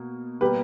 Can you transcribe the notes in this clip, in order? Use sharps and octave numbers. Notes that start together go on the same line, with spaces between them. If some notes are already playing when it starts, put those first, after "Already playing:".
Already playing: B2 A#3
B2 G3 A#3 G4 B4